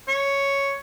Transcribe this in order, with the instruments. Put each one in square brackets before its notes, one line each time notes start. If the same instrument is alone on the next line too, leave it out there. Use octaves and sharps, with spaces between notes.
[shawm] C#5